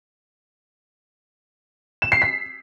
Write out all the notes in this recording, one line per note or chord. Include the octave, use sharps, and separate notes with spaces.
E7
C7
B6